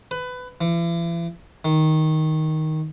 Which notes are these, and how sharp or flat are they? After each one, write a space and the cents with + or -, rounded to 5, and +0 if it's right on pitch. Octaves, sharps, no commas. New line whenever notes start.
B4 +20
E3 +40
D#3 +5